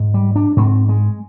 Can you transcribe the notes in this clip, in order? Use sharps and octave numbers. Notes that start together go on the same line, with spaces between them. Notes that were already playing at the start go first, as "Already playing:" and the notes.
Already playing: G#2
G3
D4
G#2 C4
G#3